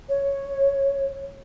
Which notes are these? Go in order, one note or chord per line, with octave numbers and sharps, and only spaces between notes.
C#5